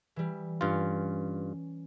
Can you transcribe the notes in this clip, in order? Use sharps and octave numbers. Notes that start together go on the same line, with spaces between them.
E3 G3
G2 C#4 F4